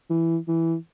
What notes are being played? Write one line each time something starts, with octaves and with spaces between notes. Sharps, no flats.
E3
E3